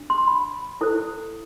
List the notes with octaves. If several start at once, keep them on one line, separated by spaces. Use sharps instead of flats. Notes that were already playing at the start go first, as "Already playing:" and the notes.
Already playing: D4
C6
B5
E4 A4 C5